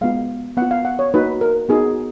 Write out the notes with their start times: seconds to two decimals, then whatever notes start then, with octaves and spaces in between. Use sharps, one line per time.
0.01 G#3 B3 F4 F5
0.57 B3 F4 F#5
0.71 F5
0.85 F#5
0.99 C#5
1.14 A#3 D#4 F#4 B4
1.41 A#4
1.69 B3 D#4 F#4 G#4